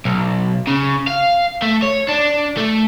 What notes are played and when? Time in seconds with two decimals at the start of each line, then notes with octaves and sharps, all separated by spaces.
0.05 B1
0.67 C#3
1.07 F5
1.62 A3
1.82 C#5
2.09 D4
2.57 A3